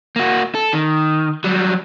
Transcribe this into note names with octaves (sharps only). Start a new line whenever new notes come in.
A#3 F#4
A4
D#3
F#3 G3